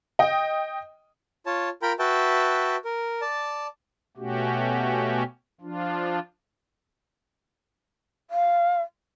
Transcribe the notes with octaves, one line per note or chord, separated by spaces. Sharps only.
D#5 G5
F4 C#5 A5
F4 A#4 G5 A#5 B5
F#4 B4 E5 G5 A5
A#4
D5 A5
B2 A3 C#4 F#4 G4
F3 D4 F4
F5